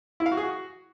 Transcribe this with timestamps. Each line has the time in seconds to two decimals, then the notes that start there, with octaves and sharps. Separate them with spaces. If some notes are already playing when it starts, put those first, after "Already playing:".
0.20 E4
0.26 F5
0.32 F#4
0.37 G#4
0.43 F#4